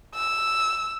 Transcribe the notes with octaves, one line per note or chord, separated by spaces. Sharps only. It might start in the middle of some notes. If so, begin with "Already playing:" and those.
E6